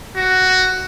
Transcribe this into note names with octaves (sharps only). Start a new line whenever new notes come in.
F#4